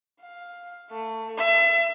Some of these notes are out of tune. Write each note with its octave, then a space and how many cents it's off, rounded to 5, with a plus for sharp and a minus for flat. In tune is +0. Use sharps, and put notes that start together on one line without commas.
F5 +10
A3 +25
E5 +30